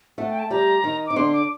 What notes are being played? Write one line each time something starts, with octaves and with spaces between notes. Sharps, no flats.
A3 A4 F#5
G5
A5
G3 G4 A#5
D#3 D#4
D#4 D6
D3 D4 C6
D6